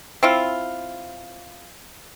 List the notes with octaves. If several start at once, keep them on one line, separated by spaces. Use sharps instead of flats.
C4 E4 F4